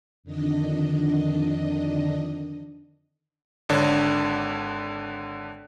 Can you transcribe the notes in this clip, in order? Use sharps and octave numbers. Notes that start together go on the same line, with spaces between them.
F2 D3 D#3 D4 D#5
G#1 D3 D4 C#5